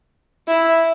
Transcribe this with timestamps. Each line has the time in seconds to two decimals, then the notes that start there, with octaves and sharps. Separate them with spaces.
0.48 E4